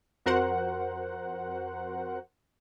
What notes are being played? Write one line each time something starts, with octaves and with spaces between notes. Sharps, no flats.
F2 F#4 A#4 C5 F#5